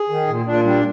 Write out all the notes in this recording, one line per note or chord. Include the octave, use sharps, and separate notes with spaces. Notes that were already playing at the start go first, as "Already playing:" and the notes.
Already playing: G#4
D#3
A#2
A#2 D4
G3 D4